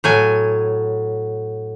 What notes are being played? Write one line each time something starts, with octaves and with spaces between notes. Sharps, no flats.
A2 F#3 G#5